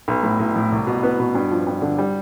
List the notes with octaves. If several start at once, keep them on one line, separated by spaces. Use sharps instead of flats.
B1
A2
B1
A2
C2
B2
B3
B2
G2
F3
G2
D3
G3